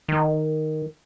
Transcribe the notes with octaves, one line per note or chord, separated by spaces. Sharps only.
D#3